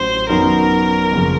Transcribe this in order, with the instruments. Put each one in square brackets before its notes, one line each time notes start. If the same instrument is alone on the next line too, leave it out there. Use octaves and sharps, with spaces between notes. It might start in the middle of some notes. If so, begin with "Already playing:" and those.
Already playing: [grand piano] A1 A2 F#3 [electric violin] C5
[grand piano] F#2 D#3 F#3 B3 [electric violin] A#4
[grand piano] G#1 F#2 C#3 F3 A#3